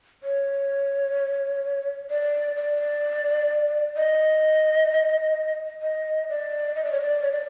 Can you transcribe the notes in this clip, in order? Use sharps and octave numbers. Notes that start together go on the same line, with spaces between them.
C#5
D5
D5
D#5
D#5
D5
D#5
D5
C#5
D5
C#5
D5